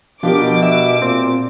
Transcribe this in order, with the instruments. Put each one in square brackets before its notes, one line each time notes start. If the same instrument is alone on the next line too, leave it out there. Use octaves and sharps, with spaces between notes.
[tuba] B2 [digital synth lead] F3 [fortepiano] D4 G4 A#4 [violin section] D6
[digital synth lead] E5
[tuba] A#2 [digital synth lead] C4